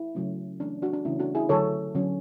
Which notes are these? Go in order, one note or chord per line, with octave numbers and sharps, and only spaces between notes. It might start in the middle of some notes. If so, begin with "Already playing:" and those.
Already playing: E4
C#3 F#3 A3 C#4
E3 A3 C#4 D4
D4 F#4
D4
C#3 E3 A3 C#4 E4
D4 F#4
E4 G#4
D3 F#3 A3 A4 C#5
D3 F#3 C#4